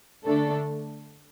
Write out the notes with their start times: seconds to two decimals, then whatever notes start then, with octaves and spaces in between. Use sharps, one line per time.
0.24 D3 A3 D4 A4